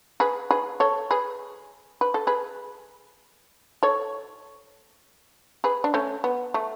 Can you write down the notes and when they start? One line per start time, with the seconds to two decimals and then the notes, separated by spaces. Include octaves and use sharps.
0.20 G#4 B4
0.51 G#4 B4
0.80 A4 C#5
1.11 G#4 B4
2.01 B4
2.14 A4
2.27 G#4 B4
3.83 A4 C#5
5.64 G#4 B4
5.84 D4
5.94 A3 C#4
6.24 B3
6.54 A3